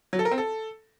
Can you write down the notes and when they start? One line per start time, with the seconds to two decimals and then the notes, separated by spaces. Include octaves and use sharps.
0.13 F#3
0.19 A4
0.25 A#4
0.32 C4
0.38 A4